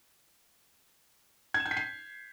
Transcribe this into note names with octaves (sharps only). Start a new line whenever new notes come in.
G#6
E7
G6
B6
C7